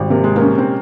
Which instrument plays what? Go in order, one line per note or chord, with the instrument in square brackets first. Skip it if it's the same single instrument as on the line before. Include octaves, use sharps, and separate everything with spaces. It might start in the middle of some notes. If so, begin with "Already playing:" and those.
Already playing: [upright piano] G#1 [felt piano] G3
[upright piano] C3 [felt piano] A#3
[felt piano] G#3
A#3
[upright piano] C#4
[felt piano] C4